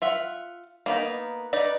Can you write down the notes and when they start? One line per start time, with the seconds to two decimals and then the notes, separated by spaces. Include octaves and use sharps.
0.02 F4 E5 F#5
0.86 A#3 B3 D#4
1.53 D#4 B4 D5